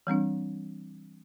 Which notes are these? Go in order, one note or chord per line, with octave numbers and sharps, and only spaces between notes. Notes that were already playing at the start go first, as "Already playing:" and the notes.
E3 G3 C4 D4